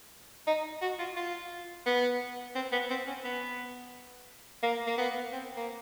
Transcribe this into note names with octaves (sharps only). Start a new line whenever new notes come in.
D#4
F#4
F4
F4
B3
C4
B3
C4
C#4
B3
A#3
A#3
B3
C4
A#3